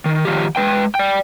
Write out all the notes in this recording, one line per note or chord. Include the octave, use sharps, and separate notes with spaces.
D#3
D#3 F3 G4
G#3 B4 G5
D5 G5